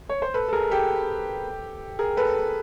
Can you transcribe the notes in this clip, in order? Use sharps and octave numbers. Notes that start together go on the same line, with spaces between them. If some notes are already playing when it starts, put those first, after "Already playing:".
C#5
C5
A4 B4
A4
G#4 A#4
G4 A4
G#4 A#4
A4 B4